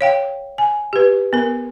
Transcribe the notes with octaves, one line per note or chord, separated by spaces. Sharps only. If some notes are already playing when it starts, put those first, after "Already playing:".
C#5 F5 G5
G#5
G4 B4
B3 A#4